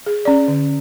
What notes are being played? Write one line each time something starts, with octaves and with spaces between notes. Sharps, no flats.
G#4
C#4 D5
D3